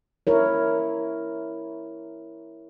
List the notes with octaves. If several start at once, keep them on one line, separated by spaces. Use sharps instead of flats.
E4 A#4 C#5